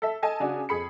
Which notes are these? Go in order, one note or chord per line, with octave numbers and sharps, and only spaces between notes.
A4 E5
A4 D#5 G#5 A5
C#3 D4 F#4 G#5
F2 G#4 B5 C#7